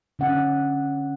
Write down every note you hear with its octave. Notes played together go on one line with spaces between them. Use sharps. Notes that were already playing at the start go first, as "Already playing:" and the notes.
D3 C#4 F#5